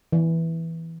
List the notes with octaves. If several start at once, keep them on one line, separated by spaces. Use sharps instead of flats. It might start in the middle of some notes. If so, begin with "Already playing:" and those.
E3